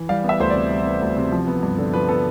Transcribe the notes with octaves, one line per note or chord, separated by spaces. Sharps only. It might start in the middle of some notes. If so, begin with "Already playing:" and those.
Already playing: E3
G3 F5
B3
E5
D2 C5
C3 D5
G3
B3
D2
C3
F3
B3
G2
D3
F3 B4
B3 A4